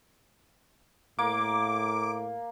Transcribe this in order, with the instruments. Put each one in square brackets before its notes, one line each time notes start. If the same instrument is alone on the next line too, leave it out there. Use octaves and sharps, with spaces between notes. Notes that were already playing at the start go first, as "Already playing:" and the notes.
[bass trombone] A2 [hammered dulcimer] A#3 [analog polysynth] D6